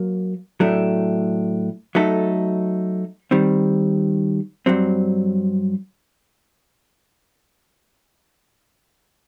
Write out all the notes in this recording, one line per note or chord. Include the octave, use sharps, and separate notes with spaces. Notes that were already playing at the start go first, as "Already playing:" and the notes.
Already playing: F#3 A#3
A2 F#3 A3 D4
F#3 A3 D#4 A4
D#3 G3 C4
G2 F#3 C4